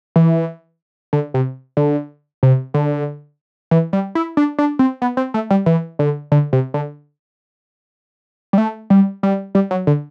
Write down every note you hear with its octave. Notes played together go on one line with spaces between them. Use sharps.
E3
D3
C3
D3
C3
D3
E3
G3
E4
D4
D4
C4
B3
C4
A3
G3
E3
D3
D3
C3
D3
G3
A3
G3
G3
G3
F#3
D3